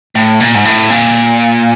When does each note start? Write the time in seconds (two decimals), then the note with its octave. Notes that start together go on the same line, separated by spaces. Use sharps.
0.15 A2
0.40 A#2
0.55 G#2
0.65 A2
0.90 A#2